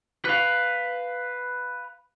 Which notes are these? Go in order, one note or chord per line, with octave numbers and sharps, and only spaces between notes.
B4 F5